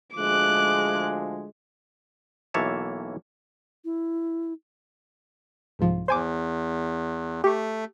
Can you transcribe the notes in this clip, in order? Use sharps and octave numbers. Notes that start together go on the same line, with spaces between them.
D2 F3 G#3 D6 F#6
B1 E3 A#3 C#5 E5 A5
E4
C2 G#2 F3
E2 C5 G#5 D6
A3 G4 C#6